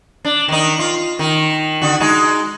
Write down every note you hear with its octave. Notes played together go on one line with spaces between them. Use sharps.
D4
D#3 D#4
F4
D#3
D3 F#4
G#3 D#4 F#4